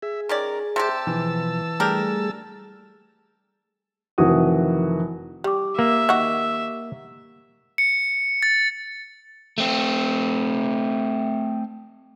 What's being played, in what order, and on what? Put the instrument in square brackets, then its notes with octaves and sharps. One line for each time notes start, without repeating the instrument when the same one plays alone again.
[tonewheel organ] G#4 [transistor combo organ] E5
[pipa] D#3 C#4 D5 [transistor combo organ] A#4
[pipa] C3 C4 G4 [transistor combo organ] A5 E6
[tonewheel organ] B2 F3 [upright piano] E3
[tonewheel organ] G3 A3 G#4 [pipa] D4 G4 A#4
[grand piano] F1 D#3 E3 F#4 D#6
[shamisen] G3 [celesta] G4 D6
[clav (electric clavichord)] A#3 [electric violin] E5
[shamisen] D#3 F#4
[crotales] C#7
A6
[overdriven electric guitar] A3 C4